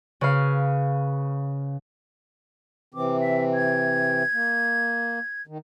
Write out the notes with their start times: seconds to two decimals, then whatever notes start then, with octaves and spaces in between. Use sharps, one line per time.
0.21 C#3 B4 F5
2.94 C3 E3 C4 D6
3.20 E5
3.54 G#6
4.33 A#3
5.47 D#3